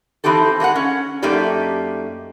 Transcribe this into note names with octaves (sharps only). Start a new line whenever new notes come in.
E3 C4 D#4 G4 A4
G#3 A#3 E4 F#5
C#4
F#2 A3 A#3 D#4 G4 D5